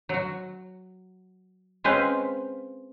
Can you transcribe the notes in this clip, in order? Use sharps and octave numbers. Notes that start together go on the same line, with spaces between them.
F#3 F#4
G#3 C4 C#4 B4 C5 F5